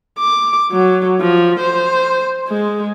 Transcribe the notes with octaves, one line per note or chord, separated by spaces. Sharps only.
D6
F#3
F3
C5
G#3